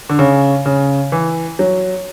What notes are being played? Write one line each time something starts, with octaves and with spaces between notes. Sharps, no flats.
D3
C#3
C#3
E3
F#3